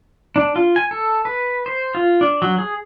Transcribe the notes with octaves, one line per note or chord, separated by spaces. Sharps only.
D4
F4
G#5
A4
B4
C5
F4
D4
F#3
G#4